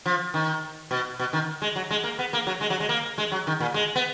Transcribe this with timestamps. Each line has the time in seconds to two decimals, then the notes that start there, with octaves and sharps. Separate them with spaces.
0.06 F3
0.34 D#3
0.91 B2
1.19 B2
1.33 D#3
1.62 G#3
1.76 F#3
1.91 G#3
2.04 A#3
2.19 B3
2.33 A#3
2.47 F#3
2.61 G#3
2.70 F#3
2.80 G#3
2.89 A#3
3.18 G#3
3.32 F#3
3.47 D#3
3.60 A#2
3.74 G#3
3.96 B3